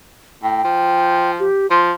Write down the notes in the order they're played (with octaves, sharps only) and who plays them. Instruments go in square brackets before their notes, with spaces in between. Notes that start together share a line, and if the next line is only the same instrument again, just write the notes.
[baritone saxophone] A2 [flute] G5
[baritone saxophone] F3
[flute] G4
[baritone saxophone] F3 [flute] C6